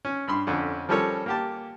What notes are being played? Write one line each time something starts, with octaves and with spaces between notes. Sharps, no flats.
C#4
G2 B5 C6
F2 D3 C#4
F3 G3 C#4 A4 A#4 C#5
A#3 G4 A5